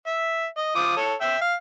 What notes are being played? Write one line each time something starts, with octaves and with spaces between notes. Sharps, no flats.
E5
D#5
F3 D6 D#6
A4 C#5
E5 G5 E6
F5